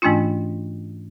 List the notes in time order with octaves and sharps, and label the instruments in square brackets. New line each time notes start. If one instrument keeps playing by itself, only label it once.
[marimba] G#2 E3 A3 C#4 D4 F4